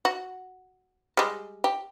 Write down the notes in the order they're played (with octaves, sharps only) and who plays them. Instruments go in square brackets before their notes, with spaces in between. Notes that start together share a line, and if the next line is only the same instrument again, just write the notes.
[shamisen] F#4
G3 G#3
G4